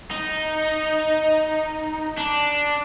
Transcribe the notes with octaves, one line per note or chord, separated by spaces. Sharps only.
D#4
D4